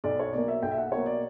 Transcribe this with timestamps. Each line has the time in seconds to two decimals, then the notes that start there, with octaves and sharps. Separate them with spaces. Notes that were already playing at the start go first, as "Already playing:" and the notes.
0.04 B1 D5
0.19 C#5
0.33 B2 A#3 D5
0.48 E5
0.62 B1 G5
0.71 E5
0.77 F#5
0.92 B2 A#3 C#5
1.06 D5